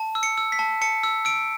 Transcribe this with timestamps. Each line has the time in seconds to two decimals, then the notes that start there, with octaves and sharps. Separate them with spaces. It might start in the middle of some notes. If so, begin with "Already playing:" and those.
Already playing: A5
0.15 E6
0.23 C#7
0.38 E6
0.52 B6
0.59 A5
0.82 A5 C#7
1.03 E6
1.25 E6 D7